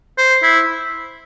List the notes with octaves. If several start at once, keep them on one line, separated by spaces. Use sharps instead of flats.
C5
E4